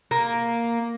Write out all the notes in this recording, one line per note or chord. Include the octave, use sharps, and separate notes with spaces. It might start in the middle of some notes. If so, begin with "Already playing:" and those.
A#3